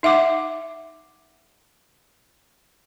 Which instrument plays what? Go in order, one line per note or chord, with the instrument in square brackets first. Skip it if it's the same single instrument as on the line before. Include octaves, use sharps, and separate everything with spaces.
[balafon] D#4 E5 F#5 D6